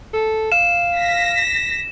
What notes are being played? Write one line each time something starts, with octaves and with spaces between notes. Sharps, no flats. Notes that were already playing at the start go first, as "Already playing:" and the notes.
A4
F5 E7
A#6 B6